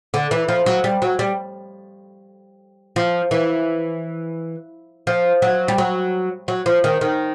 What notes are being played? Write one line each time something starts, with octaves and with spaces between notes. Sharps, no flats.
D3
E3
F3
F#3
G3
F#3
G3
F3
E3
F3
F#3
G3
F#3
F#3
F3
D#3
D#3